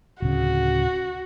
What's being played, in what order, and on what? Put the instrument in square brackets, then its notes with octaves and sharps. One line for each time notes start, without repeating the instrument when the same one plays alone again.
[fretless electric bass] D1 C#3 [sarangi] F#4